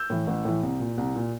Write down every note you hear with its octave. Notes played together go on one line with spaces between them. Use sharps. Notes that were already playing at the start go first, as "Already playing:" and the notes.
Already playing: E6 G6
A2 E3
A1
A2 E3
C2
A#2
C2
A#2